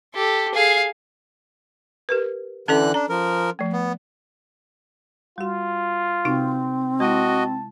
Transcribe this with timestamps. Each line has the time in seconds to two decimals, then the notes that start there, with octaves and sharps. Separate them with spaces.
0.15 G4 A4
0.54 G#4 F5
2.09 G4 A#4 B4
2.68 D3 E3 C#4 A4 D5 F#6
2.94 D4 A#5
3.09 F3 A#4
3.59 F3 A3
3.73 B3
5.38 G3 F4 F#4
6.25 C3 C4 D#4 F#4
7.00 G#3 E4 F#4 D#5 A5